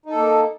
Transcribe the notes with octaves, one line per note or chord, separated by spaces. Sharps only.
A#3 D#4 A4